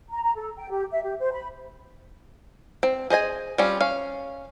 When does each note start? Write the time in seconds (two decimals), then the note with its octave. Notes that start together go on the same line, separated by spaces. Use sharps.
0.12 A#5
0.23 A#5
0.37 A4
0.57 G5
0.71 G4
0.91 E5
1.03 G4
1.20 C5
1.32 B5
2.83 C4
3.10 G#4 C5 D#5 G#5
3.58 G3 C4 C#4 F4
3.80 C#4 F5